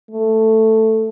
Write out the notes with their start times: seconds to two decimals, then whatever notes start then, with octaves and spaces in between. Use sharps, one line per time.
0.11 A3